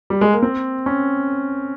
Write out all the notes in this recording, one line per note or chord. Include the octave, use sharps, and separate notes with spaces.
G3
G#3
A#3
C4
C#4